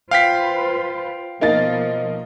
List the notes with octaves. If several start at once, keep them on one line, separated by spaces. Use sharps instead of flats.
F4 B4 C5 F5 G5 B6
B2 F3 A#3 D#4 A6